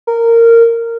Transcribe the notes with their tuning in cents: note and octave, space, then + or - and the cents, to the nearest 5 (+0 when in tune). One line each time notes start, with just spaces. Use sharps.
A#4 -15